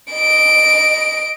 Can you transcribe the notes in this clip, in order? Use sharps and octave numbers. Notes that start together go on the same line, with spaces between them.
D#5 D7